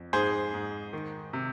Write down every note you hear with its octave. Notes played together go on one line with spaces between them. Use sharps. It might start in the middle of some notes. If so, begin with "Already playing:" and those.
Already playing: F2
G#2 G#4 C5
G#2
D#3
C3